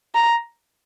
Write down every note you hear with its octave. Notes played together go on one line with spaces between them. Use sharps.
A#5